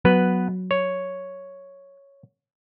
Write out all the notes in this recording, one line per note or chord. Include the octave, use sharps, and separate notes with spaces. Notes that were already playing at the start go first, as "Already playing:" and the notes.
F#3 B3 B4
C#5